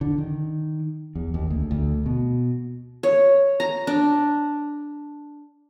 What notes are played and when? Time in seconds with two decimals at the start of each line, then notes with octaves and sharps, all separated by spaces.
0.01 D3
0.18 D#3
1.15 E2
1.34 D#2
1.50 D2
1.71 D2
2.06 B2
3.03 C#5
3.60 A#5
3.87 D4